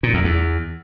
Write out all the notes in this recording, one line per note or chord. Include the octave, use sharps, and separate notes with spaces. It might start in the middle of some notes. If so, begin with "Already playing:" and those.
A#2
E2
E2